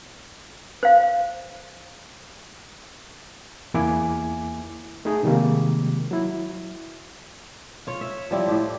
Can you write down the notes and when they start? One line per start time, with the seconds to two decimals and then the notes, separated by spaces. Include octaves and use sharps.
0.83 C5 F5
3.74 E2 A#3 E4 G#5 D6
5.05 A3 D#4 G#4
5.23 C3 D#3 G3 G#3 A#3
6.11 F#3 E4
7.87 F4 C#5
8.01 E5
8.31 F3 G3 E4
8.46 A2 G4 C5